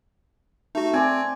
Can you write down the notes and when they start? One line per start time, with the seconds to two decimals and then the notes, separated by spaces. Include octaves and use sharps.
0.75 A3 D#4 F#4
0.94 C4 C5 D5 G#5